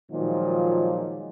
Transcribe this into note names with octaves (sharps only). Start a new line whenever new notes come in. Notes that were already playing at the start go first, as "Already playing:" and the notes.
A#2 D#3 F3 F#3 G#3 D#4